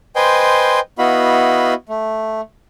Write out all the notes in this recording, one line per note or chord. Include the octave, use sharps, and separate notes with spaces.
B4 C5 D#5 G5 G#5 C6
B3 E4 F#4 D#5 F5 B5
A3